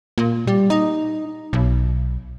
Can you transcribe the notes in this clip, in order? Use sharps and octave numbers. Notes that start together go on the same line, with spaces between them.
A#2
G3
D#4
B1